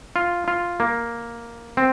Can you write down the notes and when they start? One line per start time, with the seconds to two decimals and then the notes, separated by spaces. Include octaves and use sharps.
0.16 F4
0.48 F4
0.80 A#3
1.77 C4